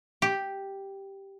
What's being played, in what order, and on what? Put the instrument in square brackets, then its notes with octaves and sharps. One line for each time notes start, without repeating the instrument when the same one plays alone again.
[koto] G4